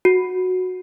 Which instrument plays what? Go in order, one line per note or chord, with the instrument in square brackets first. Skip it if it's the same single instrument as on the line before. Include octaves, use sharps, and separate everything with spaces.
[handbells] F#4